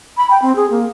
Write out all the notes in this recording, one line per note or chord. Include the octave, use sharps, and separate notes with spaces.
B5
G5
C4
G#4
A#3